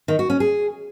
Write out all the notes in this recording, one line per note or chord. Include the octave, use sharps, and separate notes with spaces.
D#3
F#4
C#4
G#4